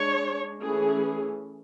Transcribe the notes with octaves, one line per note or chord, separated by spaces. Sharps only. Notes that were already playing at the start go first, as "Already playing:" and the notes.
Already playing: G#3 D4 C#5
E3 A3 C#4 G#4